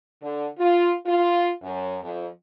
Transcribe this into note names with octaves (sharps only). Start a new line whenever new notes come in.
D3
F4
F4
F#2
F2